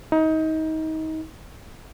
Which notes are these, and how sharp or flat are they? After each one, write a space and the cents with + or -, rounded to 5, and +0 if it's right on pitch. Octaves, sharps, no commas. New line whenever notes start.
D#4 +25